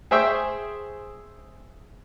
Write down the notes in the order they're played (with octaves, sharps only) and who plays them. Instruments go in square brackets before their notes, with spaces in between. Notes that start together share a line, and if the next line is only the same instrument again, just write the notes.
[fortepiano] G#4 C5 E5 G5 C#6